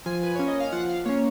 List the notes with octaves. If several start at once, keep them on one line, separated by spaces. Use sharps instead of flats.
F3 G#5
B4
A#3 C#4 C#5
D#5
F5
F3 F#5
F5
A#3 C#4 C#5